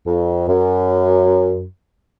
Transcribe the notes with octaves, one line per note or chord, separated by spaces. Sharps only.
F2
F#2